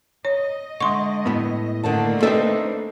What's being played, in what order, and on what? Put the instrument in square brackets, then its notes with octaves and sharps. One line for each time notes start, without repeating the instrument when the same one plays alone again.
[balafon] C#5 [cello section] D#5
[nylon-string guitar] D3 [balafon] G#3 C6 C#6
[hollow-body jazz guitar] A2 B3
[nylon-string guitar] D3 D#3 A5 [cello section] A3 A#3 D4
[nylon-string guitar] C4 D#4 B4 [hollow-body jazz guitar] A4 E5